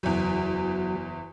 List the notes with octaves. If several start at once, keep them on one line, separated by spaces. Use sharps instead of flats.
F#1 E2 F#3 F#4